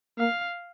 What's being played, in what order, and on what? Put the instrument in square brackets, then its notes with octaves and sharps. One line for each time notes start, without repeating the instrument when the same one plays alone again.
[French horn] A#3 [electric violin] F5